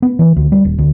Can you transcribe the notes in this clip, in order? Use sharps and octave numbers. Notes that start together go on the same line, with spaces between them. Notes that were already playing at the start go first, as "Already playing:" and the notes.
B3
E3
D2
G3
D#1
D2